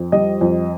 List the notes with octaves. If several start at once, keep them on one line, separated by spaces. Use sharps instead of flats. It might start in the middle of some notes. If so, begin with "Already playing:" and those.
Already playing: F2
G3 D#5
F2